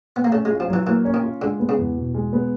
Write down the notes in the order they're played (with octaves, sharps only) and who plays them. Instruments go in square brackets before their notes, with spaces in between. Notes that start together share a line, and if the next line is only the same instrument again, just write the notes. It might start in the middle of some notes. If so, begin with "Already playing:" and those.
[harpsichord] B3
A#3
[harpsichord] A3 [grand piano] C#4
[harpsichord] G#3
[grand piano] F4
[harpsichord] F3
[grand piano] F#3
[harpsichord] E3
[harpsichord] E3 [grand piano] A#3
[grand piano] C#4
[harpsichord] D#3
[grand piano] F4
[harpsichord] D3 [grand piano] G#3
[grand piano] B3
[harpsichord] C#3
[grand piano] E2
B2
G#3
B3